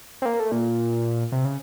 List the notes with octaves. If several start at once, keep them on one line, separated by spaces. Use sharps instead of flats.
C4
A#3
A3
A#2
C3
C#3